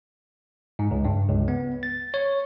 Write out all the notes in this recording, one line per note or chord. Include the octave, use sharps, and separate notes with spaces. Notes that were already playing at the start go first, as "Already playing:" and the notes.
G#2
C#2
G2
C#2
B3
A6
C#5